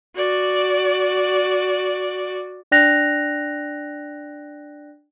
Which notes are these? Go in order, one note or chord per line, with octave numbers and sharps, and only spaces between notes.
F#4 D5
D4 D5 G5 F#6 A#6 F7